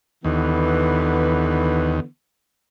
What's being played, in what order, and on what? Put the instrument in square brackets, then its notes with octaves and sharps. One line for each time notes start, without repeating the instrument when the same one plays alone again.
[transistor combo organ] D#2 [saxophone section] D3 E3 B3